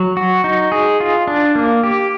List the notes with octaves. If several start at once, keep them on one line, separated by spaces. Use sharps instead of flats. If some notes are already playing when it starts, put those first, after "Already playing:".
Already playing: F#3
F#4
D#4
G#4
F4
D4
A#3
G4